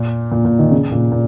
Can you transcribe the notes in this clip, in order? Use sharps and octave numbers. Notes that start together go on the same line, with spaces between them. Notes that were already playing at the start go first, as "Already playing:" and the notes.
Already playing: A#2
A#2
A#2
D#3
C#3
A#2
A#2